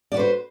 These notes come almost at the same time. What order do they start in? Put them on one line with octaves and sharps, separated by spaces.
D5 F#4 B4 C5